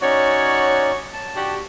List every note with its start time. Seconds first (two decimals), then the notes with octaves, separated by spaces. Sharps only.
0.01 C#4 D#4 F#4 C#5 D5
1.13 A5
1.36 D4 F#4 G4